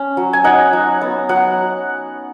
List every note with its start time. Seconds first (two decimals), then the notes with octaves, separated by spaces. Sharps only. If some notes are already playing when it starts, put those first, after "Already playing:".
Already playing: C#4
0.17 F#3
0.33 G#5
0.44 D#4 F#5
0.73 F#3
1.01 B3
1.29 F#3 F#5